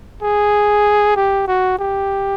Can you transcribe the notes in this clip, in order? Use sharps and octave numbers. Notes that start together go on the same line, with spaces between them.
G#4
G4
F#4
G4